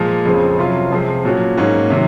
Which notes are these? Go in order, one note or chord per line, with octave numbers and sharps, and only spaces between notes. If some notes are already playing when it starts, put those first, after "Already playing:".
Already playing: A#2 F3 G#3
F2 C#3 G#3 C4
C3 F#3 C#4 F4
C3 F3 G#3 C4
A#2 F#3 C#4 F#4
G#2 F#3 A#3 C#4 F#4
C3 D#3 F#3